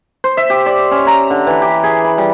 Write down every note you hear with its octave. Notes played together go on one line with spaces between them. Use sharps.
C5
E5
G4
D5
C#4
A#5
D3
E3
G4
G#4
B5
G3